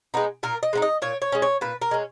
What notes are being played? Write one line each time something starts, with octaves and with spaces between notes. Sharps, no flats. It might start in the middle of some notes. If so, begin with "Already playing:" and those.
G#3 B3 D#4
A#2 A#4
D#5
G#3 B3 D#4
D#5
A#2 C#5
C#5
G#3 C#4
C#5
A#2 B4
A#4
G#3 C#4